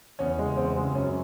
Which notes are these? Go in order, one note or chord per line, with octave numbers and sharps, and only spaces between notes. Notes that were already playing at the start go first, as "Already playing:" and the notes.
E2 C#4
C#3 G#3
E2 C4
C#3 G#3
F#2 C#4